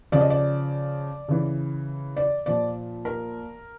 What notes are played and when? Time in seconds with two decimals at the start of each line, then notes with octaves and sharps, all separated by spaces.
0.12 C#3 F3 D5
0.21 D#5
0.30 D5
1.28 C#3 E3
2.17 D5
2.46 A#2 F3 D5
3.05 A#4